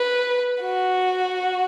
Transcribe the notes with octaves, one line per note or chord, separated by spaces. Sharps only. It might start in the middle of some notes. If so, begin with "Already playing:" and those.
Already playing: B4
F#4